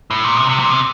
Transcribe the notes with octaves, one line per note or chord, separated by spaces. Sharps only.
A2
A#2
C3
C3
A#2
C3